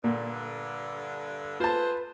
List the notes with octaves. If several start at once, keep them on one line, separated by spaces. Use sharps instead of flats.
G2 A#2 D3
A3 F4 G#4 B4 C5 A5